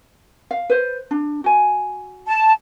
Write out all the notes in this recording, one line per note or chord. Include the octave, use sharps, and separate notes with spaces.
F5
B4 C5
D4
F#4 G#5
A5